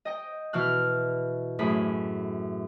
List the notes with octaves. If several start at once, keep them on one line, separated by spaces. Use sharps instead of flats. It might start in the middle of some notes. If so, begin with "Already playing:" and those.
D#5 G5
B2 E3 F6 F#6
F#2 A2 G#4 B5